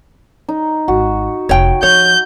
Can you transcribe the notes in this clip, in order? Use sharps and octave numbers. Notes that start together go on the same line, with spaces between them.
D#4
G#1 F#4
F1 C#5 G5
F3 C#5 G6